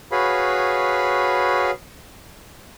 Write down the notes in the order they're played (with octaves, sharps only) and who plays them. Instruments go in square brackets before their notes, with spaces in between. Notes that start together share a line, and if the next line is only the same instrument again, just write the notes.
[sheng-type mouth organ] F#4 G#4 B4 C#5 F5 B5